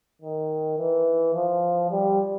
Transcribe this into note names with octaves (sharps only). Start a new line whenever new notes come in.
D#3
E3
F3
G3